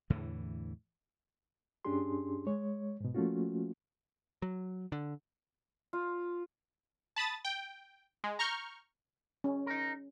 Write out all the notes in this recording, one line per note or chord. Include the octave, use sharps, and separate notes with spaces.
E2 A2 D3 E3
G2 C#4 D4 G4 G#4 C6
G#3 C#5
G#2 B2
F3 A3 A#3 C#4 F4 F#4
F#3
D3
F4
A5 B5 D#6 A6
G5
G#3
A#5 C#6 F6 G6
C#4
D#4 A#4